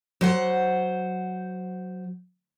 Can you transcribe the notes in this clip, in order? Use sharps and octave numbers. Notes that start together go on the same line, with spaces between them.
F#3 C5 F#5